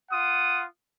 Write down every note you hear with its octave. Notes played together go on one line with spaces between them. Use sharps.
F4 F#5 D#6